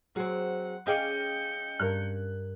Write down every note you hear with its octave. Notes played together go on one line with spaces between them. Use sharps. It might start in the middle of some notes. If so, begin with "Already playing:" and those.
F#3 C4 G#4 F#5
C#4 G#4 D5 D#5 F5 G5 G6 C#7
G2 A#4 F#6 G#6